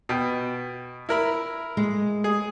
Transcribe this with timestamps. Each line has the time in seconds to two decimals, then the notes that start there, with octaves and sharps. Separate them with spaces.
0.09 B2 G5
1.09 E4 A#4 B5
1.77 G#3
2.24 G#4